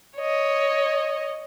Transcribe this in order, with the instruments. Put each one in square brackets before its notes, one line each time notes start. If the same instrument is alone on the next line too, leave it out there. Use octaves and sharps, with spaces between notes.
[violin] C#5 D#5